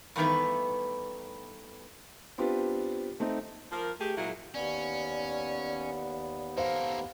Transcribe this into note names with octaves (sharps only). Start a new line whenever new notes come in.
G2 D#3 E3 A3 B3 B4
B3 C4 D4 F4 G4
A3 C4 D#4
F3 A#3 A#4
A3 G4 G#4
A#2 F#3 G#3 E4 F4 G#4
D#2 B3 C#4 D5
A#3 A4 C5 F5